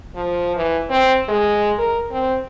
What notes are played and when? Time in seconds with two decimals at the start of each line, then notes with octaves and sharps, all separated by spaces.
0.16 F3
0.57 E3
0.90 C4
1.29 G#3
1.79 A#4
2.11 C4